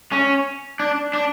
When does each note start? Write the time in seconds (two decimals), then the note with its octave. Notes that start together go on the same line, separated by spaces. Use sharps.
0.12 C#4
0.80 D4
1.13 D4